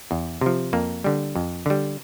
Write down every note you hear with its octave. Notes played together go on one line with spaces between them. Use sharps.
E2
C3 F3
F2 A#3
D3 G3
F2
D3 G3